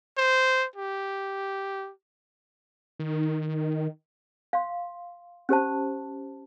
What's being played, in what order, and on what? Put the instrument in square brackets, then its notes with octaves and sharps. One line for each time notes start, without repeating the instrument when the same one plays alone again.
[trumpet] C5
G4
[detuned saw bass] D#3
[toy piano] F5 C6
C#4 G4 C5 A5